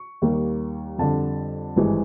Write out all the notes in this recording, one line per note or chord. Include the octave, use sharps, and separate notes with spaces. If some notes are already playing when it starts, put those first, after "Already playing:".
Already playing: C#6
D#2 D#3 G3 A#3
F2 D3 G3 A5
G#1 G2 E3 G#3